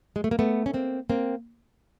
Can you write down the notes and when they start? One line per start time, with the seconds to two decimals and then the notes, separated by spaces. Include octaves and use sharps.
0.16 G#3
0.24 A3
0.31 A#3
0.39 A3 B3
0.66 C#4
0.74 A#3 C4
1.10 A#3 C4